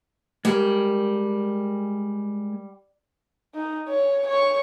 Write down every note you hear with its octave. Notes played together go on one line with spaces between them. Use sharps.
G3 G#3 A#4
D#4
C#5
C#5 C#6